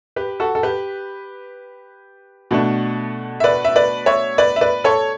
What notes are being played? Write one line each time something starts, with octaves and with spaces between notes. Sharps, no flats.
G4 B4
F#4 A4
A4
G4 B4
B2 A3 D4
E5
B4 D5
E5
B4 D5
C#5 E5
B4 D5
E5
B4 D5
A4 C#5